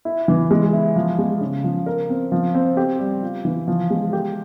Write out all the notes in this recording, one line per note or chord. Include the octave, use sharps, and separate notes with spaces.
E4
E3
G#3
E4
F3
G#3
C#3
F3
A#4
C4
F3
C4
G4
G3
F4
E3
F3
G#3
G4